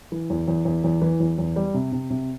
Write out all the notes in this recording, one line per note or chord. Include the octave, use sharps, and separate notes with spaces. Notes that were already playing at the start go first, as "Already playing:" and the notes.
E3
E2
E2
E2
E2
E3
E2
E2
G3
C3
C3
C3